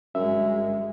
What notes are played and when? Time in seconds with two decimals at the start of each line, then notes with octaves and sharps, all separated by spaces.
0.15 G1 F#2 G#3 E5